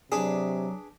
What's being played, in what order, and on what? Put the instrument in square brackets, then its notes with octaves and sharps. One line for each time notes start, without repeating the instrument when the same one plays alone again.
[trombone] C3 [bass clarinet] F#3 [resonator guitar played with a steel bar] D4 B4 [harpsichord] G#4